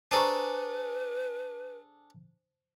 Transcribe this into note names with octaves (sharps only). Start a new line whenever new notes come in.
D4 G#4 A4 B4 C5 A#5 C#6